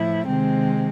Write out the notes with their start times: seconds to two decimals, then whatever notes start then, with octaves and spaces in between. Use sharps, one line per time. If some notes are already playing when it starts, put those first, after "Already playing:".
Already playing: A2 F3 E4
0.27 C3 D#3 G#3 C4